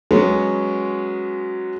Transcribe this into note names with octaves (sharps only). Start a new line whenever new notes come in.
F#3 G#3 B3 C#4